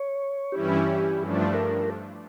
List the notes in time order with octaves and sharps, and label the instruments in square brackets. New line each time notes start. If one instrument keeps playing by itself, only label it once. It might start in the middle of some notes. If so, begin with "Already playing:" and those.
Already playing: [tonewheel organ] C#5
[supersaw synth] G2 E3 G3 C#4 E4 [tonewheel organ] G4
[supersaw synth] G2 F3 A3 D4
[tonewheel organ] A#4